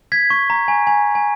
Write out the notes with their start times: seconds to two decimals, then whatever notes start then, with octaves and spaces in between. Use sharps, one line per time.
0.12 G#6 B6
0.30 C#6
0.50 A#5
0.68 G#5
0.87 G#5
1.15 G#5